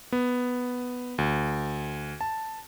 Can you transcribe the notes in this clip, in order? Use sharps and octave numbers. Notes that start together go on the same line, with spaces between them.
B3
D2
A5